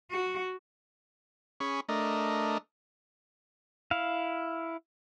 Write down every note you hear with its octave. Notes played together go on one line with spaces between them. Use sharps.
F#4
C#4 G#4 B5 C#6
A3 D4 A#4 D#5
E4 F5